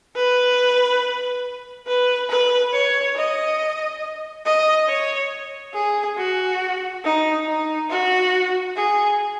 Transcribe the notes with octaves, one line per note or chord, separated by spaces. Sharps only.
B4
B4
B4
C#5
D#5
D#5
C#5
G#4
F#4
D#4
D#4
F#4
G#4